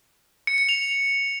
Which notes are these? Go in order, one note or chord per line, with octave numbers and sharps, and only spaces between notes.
C#7
C#7
F7